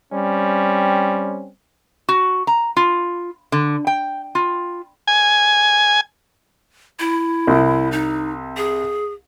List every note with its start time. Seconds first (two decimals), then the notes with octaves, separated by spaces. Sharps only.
0.13 G3 C4 C#4
2.09 F#4
2.47 A#5
2.77 F4
3.52 D3
3.87 G5
4.35 F4
5.08 G#5
6.99 E4
7.47 C2 C3
7.92 D#4
8.57 G#4